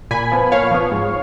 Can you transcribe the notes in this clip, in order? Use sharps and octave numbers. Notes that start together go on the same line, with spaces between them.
A#2 G#5 B5
F3 B3
A#2 C#5 F5
F3 B3
G#2